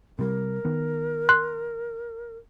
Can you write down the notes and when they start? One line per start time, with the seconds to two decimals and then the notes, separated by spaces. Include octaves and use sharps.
0.19 C3 G3 A#4
0.65 D#3 B3
1.29 C6 F#6